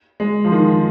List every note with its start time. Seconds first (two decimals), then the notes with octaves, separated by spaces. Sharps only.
0.20 G#3
0.45 F3
0.52 D#3